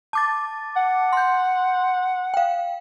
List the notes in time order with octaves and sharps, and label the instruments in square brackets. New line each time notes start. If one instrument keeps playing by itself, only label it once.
[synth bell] A5 D6 A6
[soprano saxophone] F#5
[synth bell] C6 G6
F5 G5